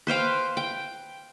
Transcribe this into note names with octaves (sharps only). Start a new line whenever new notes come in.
B4 C5 F5 G5
G5